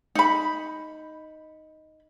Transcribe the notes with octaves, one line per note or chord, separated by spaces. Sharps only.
D#4 B5